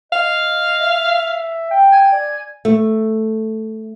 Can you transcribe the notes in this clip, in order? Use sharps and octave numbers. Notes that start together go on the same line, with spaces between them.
D#5 F5
E5
G5
G#5
D5
A3